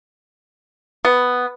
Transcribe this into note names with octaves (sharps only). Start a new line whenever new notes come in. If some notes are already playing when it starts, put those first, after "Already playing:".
B3